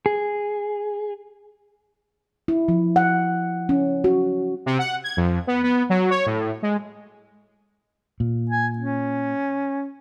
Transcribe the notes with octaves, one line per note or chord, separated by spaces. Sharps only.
G#4
E4
F3
F#5
C#4
F#4
C3
F#5
G#6
F2
B3
B3
F#3
C#5
A2
G#3
A#2
G#5
C#4